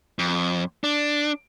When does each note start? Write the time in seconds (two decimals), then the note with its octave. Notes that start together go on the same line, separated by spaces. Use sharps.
0.19 F2
0.84 D4